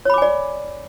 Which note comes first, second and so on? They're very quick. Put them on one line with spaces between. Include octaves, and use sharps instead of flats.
C#5 B5 D6 G#5 D5